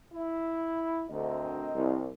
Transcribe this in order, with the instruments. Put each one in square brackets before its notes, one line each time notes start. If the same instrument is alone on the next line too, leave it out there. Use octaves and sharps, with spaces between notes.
[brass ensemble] E4
[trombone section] D2 [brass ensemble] C4 A#4 D#5
[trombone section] C2